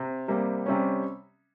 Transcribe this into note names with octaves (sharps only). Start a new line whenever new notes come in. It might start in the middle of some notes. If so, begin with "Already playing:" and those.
Already playing: C3
C3 G3 A#3
C3 G3 C#4